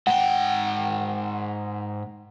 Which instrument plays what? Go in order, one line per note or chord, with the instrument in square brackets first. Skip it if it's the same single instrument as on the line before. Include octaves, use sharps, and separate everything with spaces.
[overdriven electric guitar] G#2 G5 [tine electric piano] F#5